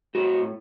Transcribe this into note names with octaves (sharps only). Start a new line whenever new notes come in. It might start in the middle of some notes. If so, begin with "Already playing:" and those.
A2 F#4